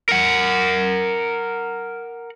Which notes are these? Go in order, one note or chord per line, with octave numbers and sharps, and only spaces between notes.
A#4 F#5